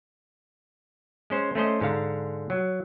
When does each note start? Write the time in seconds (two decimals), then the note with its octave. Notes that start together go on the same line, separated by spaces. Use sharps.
1.30 G#3 C#4 C5
1.55 A3 C#4 C5 D#5
1.81 G#2 D3 F5 A#5
2.50 F#3